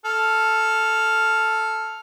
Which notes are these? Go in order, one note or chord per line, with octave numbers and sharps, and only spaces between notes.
A4 F6